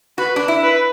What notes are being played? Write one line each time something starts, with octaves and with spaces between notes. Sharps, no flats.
F#4 B4
D4
E4
B4